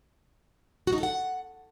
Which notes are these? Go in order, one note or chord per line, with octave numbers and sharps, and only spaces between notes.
F#4
D#4
A4
F#5